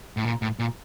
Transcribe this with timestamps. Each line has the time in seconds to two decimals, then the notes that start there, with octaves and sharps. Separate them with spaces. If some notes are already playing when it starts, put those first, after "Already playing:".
0.17 A2
0.25 A#2
0.42 A2
0.59 A#2